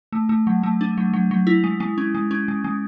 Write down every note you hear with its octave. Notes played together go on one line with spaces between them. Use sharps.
A3
A3
F#3
A3
D4
F#3
F#3
F#3
E4
G#3
G#3
C#4
G#3
C#4
G#3
G#3